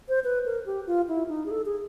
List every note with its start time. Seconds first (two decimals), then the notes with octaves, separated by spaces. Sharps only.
0.09 C5
0.24 B4
0.46 A#4
0.66 G4
0.87 F4
1.09 E4
1.29 D#4
1.46 G#4
1.51 A4
1.66 G#4